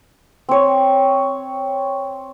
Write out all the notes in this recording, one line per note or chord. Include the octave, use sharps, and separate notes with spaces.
C4 C#5